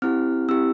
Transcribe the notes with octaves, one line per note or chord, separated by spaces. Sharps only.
C4 E4 G4 F6
C4 E4 G4 E6